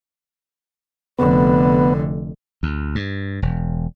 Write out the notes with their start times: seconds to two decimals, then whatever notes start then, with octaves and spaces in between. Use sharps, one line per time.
1.19 F1 D3 B3
2.63 D2
2.95 G2
3.42 E1